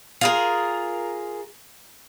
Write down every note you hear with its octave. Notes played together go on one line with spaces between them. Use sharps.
F4 G#4 A#4